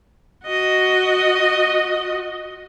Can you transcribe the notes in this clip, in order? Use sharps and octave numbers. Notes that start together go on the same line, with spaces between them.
F#4 D#5